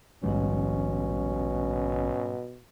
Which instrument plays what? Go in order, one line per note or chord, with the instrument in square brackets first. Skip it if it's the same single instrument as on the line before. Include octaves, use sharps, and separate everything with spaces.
[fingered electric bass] A#1 D#3 F3 [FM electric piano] G#2 G3 [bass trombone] B2 [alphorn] C#4